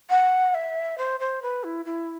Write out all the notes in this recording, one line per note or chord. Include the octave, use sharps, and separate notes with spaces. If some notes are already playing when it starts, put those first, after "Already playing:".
F#5
E5
C5
C5
B4
E4
E4